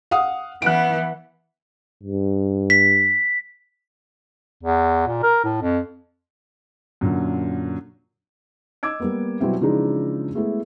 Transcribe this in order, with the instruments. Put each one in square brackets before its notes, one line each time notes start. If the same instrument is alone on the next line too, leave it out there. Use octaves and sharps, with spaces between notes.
[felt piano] F5 F#5 D#6
[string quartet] E3 B3 [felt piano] F#6 D7
[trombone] G2
[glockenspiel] B6
[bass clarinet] E2
A#2
A#4
A2
F2
[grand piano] F#2 A#2 D3
[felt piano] D#5 D6 E6 G#6 D7
G3 A#3 B3
B2 F#3 G3 B3 C4 E4
C#3 E3 F3 G#3 D4 D#4
G#3 A3 B3 E4 G#4